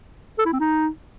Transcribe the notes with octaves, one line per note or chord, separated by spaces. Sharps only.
A4
E4
C4
D#4